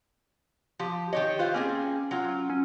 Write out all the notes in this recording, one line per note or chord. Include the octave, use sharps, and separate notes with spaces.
F3 G4
D#3 G4 C#5 D#5
F4 B4 C5 F5
A#3 C4 C#4 G#4
F#3 F4
C#4